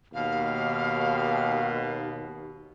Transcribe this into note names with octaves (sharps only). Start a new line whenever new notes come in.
D#2 B2 F5